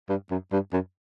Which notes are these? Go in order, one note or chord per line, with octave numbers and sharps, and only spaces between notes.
G2
F#2
G2
F#2